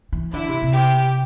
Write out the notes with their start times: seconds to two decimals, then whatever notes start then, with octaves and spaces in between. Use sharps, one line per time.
0.13 E3
0.33 D3 E4
0.48 C3
0.62 C3
0.76 G4